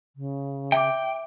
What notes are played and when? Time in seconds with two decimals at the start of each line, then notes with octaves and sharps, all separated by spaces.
0.16 C#3
0.72 E5 G5 D6